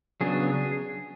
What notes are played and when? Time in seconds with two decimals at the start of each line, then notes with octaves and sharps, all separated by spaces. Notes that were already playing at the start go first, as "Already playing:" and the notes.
0.21 C#3 F#3 B3 D4 G#4